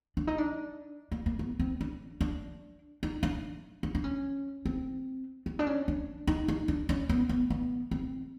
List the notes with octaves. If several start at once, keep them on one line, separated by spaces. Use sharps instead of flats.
D4
D#4
D4
A#3
A#3
B3
C4
D4
D4
D#4
D4
D4
D4
C#4
C4
C4
D4
C#4
D4
D#4
D#4
D4
C#4
B3
B3
B3
C4